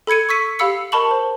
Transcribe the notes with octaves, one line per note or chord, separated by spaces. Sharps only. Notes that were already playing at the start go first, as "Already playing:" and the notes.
A4 B5 G#6 C#7 D#7
C#6 E6 B6 D#7
G4 F5 B5 E6 C#7
A#4 D#5 A5 B5 C#6 F#7
C5